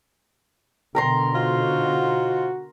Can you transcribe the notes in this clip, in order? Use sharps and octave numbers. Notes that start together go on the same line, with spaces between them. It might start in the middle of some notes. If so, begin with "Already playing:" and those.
B2 D3 A#4 A#5 C6
D#4 F4 F#4 C5